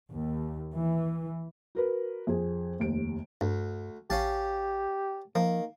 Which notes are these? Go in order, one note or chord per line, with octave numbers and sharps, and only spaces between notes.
D#2
E3
F#4 A#4 B4
F2 G#4
F1 D#2 D7
D2 G2
A1 C#4 G4 F5 A5
D#3 F3 A#3